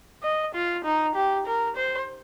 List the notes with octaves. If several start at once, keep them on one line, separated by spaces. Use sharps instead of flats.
D#5
F4
D#4
G4
A#4
C5